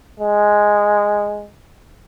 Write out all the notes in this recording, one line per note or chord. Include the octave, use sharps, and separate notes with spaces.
G#3